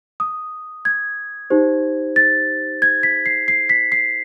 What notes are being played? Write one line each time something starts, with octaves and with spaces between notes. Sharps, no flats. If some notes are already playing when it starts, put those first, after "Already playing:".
D#6
G#6
D#4 G4 C5
A6
G#6
B6
C7
C7
B6
C7